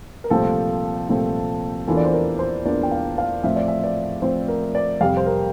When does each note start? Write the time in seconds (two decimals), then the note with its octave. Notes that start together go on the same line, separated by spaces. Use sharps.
0.24 A#4
0.30 C2 A#2 F3 A3 C4 A4
1.09 C2 A#2 F3 A3 C4
1.87 E2 E3 A#3 D4 F4 A4
1.97 D5
2.05 C5
2.13 A#4
2.39 C5
2.65 E2 E3 A#3 D4 F4 D5
2.83 G5
2.91 F5
3.18 F5
3.43 A2 F3 C4 E5
3.56 D5
3.68 E5
3.83 D5
4.22 A2 F3 C4 C5
4.48 A#4
4.75 D5
5.01 F2 C3 G3 F5
5.17 C5
5.26 A#4